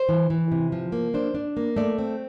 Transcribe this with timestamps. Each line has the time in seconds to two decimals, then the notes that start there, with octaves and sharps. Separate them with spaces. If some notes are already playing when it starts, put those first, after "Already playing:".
Already playing: C5
0.09 E3
0.30 E3
0.52 C3
0.72 F3
0.92 A#3
1.14 D4 C5
1.35 D4
1.57 A#3
1.76 A3 D5
1.99 C4